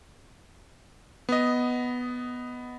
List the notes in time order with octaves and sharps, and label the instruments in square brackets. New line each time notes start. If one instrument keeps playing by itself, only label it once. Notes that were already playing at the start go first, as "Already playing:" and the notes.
[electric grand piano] B3 D#5